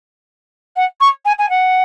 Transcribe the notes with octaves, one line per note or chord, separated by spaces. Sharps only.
F#5
C#6
G#5
G#5
F#5